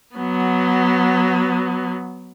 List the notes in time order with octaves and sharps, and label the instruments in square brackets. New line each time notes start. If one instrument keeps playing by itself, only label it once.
[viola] F#3 B3